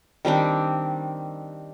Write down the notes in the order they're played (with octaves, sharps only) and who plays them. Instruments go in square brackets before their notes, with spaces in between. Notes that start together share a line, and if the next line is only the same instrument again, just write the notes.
[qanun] D#3 G3 C4 D4